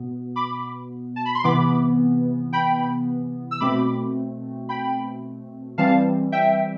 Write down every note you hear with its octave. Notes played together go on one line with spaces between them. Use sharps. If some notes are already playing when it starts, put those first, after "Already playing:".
Already playing: B2 B3
B5 D6
A5
B5
C6
C3 E3 B3 B5 D6
G5 B5
E6
B2 A3 C4 B5 D6
G5 B5
E3 G3 C4 F5 A5
E5 G5